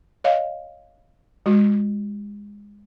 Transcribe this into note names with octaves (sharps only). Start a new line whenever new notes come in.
C#5 D#5 F5
G#3 F#4